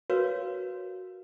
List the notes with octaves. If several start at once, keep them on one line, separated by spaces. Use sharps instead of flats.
F#4 A#4 B4 C#5 F5 E6